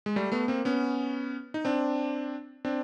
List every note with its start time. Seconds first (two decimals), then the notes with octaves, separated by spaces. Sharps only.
0.06 G#3
0.16 G3 A3
0.32 A3 B3
0.48 A#3 C4
0.65 B3 C#4
1.54 D#4
1.65 C4 D4
2.65 C4 D4